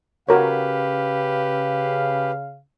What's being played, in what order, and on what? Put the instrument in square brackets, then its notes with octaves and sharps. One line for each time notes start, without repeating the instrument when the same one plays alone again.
[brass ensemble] C#3 F5 [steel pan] F#4 A#4 C#5 [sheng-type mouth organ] G4 B4